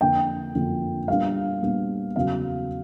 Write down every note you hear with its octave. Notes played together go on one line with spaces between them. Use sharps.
F2 D3 F3 A#3 D4 G5
F2 D3 F3 A#3 D4
A#2 G3 B3 D4 F5
A#2 G3 B3 D4
E2 C#3 F#3 F5